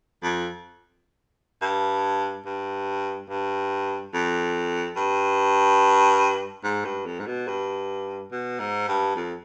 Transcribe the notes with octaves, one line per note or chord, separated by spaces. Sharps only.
F2
G2
G2
G2
F2
G2
G#2
G2
F2
G#2
B2
G2
B2
G#2
G2
F2